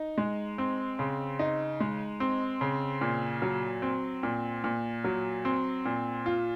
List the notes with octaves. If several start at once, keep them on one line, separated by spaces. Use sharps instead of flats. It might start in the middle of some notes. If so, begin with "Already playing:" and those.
Already playing: D#4
G#3
C4
C#3
D#4
G#3
C4
C#3
A#2
F#3
C4
A#2
A#2
F#3
C4
A#2
F4